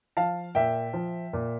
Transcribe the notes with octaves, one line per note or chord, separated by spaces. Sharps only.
F3 F5 A5
A#2 E5 G5
F3
A#2